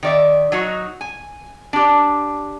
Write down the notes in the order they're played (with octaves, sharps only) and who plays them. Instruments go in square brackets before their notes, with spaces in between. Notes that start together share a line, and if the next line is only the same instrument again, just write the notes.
[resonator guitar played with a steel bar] D#3 D5 E5
F#3 D#4 F#4
G#5
D4 G4